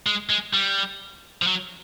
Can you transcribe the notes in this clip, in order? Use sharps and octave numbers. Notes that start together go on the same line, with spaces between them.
G#3
G#3
G3
F3
F#3